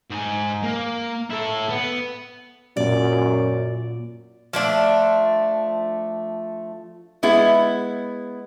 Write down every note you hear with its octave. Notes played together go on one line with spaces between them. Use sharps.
G#2 G#5
A#3
E4 A4
B3
F#2 A#2 D5
F3 A3 D4 E5
G#3 B3 E4